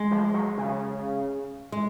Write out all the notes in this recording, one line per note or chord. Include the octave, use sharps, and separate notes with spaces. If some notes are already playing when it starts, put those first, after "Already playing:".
Already playing: G#3
F3
F#3
C#3
G#3